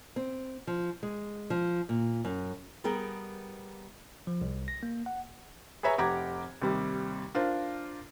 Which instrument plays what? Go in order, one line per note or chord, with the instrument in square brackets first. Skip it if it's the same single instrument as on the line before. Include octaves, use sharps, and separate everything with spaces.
[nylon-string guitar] C4
F3
G#3
F3
A#2
F#2
G3 B3 G#4 A#4 G5
[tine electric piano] F3
C2
A#6
A#3
F#5
[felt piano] G#4 B4 C#5 E5 G#5 A#5
F1 G4 F#5 A#5 D6 G#6
D#2 C3 G3
D4 F4 A#4 C5